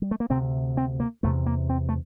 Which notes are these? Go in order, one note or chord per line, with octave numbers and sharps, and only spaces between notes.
G3
A3
A#3
D2 C3 C4
C4
A#3
E2 C3 A3
A#3
C4
A3